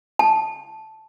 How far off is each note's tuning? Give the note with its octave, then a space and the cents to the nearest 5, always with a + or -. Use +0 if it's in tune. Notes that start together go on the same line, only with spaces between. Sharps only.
A5 -10